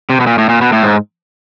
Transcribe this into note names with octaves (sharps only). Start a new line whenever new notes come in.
C3
B2
A#2
A2
A#2
B2
A2
G#2